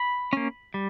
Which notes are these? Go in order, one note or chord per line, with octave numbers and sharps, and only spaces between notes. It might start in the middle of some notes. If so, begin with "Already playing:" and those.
Already playing: B5
A#3 C#4
G3